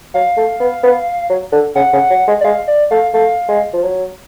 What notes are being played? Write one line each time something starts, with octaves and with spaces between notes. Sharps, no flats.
F#3 F5
A3
B3
B3
F#3
D3
C#3 F#5
C#3
F#3
G#3
D5
G#3 F5
D5
A3 F5
A3 F5
G#3
F3
F#3